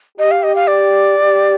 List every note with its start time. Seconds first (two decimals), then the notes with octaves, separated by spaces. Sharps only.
0.18 G4 D#5
0.31 F5
0.43 D#5
0.55 F5
0.67 D5
1.17 G4